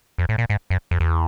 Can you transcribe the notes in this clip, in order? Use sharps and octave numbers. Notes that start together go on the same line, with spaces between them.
F2
A2
A#2
G#2
F#2
F2
E2